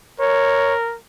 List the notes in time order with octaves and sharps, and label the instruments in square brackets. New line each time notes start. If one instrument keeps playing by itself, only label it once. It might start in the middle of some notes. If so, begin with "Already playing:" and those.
[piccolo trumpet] A#4 [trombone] C#5